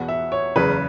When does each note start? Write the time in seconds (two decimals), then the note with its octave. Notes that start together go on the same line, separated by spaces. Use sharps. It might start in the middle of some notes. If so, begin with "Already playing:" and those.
Already playing: E2 B2 B3 F#5
0.08 E5
0.32 C#5
0.56 F#1 E2 C#3 B4